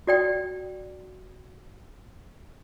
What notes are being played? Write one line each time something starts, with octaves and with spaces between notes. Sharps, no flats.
F#4 D5 G5